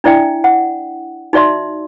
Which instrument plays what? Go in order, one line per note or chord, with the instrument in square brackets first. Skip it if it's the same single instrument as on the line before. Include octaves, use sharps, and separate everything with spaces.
[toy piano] D4 E4 D5 E5 G5
F#5
D#4 F#4 D5 E5 C6